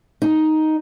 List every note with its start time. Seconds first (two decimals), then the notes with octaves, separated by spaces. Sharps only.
0.22 D#4